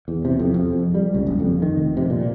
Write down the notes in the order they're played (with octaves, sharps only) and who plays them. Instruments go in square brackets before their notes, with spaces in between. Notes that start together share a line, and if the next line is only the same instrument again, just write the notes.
[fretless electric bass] E2
C3
F2
F2
G3
C#2
F#1
F2
D#3
F1
C3
A#2